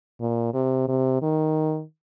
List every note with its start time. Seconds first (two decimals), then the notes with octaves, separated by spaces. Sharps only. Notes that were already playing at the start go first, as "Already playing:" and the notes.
0.20 A#2
0.54 C3
0.88 C3
1.22 D#3